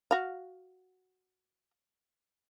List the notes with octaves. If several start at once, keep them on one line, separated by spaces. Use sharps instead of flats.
F#4 F5